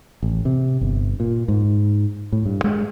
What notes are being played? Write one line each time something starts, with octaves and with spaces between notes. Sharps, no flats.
A1
C3
G1
A#2
G#2
A2
G2
G#3